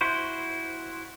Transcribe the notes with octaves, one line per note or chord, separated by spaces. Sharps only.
E4 F#4 C5